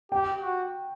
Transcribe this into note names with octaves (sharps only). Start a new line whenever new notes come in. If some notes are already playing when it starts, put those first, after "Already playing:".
G4 G5
F#4